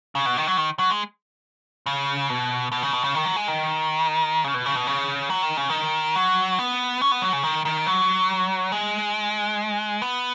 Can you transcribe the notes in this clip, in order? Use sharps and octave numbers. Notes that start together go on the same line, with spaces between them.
C#3
B2
D#3
F#3
D#3
F#3
G#3
C#3
B2
B2
C#3
B2
C#3
D#3
F#3
G#3
D#3
C#3
B2
C#3
B2
C#3
F#3
D#3
C#3
D#3
F#3
B3
C#4
B3
F#3
C#3
D#3
D#3
F#3
G#3
B3